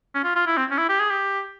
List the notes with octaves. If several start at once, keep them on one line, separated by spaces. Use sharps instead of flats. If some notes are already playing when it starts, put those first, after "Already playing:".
C#4
F4
F4
E4
C4
C#4
E4
G4
G#4
G4